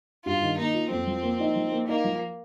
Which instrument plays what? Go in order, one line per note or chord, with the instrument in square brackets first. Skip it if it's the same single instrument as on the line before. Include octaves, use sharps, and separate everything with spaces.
[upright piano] G2 [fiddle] F4
[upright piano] D#3
[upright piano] A#3 [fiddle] D#4
[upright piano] F4
[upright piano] F2 [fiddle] C4
[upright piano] F3
A#3
D#4
F3
A#3
[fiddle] A#3 [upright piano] D#4
[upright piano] F3